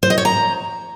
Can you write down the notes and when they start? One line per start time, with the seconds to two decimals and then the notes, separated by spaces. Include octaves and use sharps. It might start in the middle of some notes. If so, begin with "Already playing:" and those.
0.03 C5
0.10 D#5
0.18 C#5
0.25 A#5